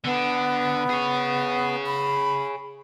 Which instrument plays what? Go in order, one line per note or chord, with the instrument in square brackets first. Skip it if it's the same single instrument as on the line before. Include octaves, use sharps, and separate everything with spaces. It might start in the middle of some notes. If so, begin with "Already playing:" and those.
[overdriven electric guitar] D3 D4 [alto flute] B3
[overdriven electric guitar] G#4 C#5
[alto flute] B5